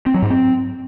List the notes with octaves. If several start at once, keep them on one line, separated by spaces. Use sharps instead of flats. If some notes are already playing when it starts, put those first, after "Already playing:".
C4
F#3
G#2
C4